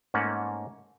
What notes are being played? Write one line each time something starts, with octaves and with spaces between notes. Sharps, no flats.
G#2 A3 A#3 C#4 F#5